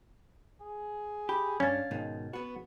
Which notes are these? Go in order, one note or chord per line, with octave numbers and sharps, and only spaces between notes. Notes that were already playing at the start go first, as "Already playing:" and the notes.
G#4
G4 B5
G2 C#4 D4 F5 G#6 A6
G#2 B2 D#3
B3 F#4 B4